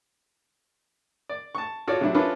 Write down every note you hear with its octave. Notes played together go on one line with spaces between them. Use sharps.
D5
A5 C#6
F4 F#4 A4 C#5 D5
C3 F#3 D4 E4
C#4 D4 E4 F4 A4 B4